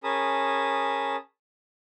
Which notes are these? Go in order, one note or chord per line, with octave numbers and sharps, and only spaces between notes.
C#4 G#4 A#4 A5 B5 D#6